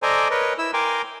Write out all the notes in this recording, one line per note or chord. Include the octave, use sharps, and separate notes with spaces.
A4 C5 D5 D#5 G#5 A#5
A#4 B4 C#5 D#5
E4 E6
A#4 G5 G#5 A#5 C6 D6